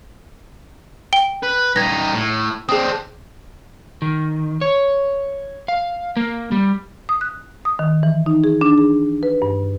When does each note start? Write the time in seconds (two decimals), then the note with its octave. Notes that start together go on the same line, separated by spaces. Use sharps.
1.13 G5 G7
1.43 B4
1.76 G3 D#4 G#6 A#6
2.14 A2
2.69 C4 D4 G#4 D#6
4.02 D#3
4.61 C#5
5.68 F5
6.17 A#3
6.52 G3
7.09 D#6
7.21 F#6
7.65 D#6
7.79 D#3
8.03 E3
8.26 D#4
8.44 G#4
8.61 D4
8.78 G#4
9.23 B4
9.42 G2